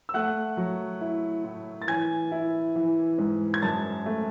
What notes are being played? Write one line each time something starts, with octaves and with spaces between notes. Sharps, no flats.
E6
A3 F#5 F#6
F#3
E4
A2
A6
E3 G#5 G#6
E4
E3
G#2
G#6
F#2 A5 A6
A3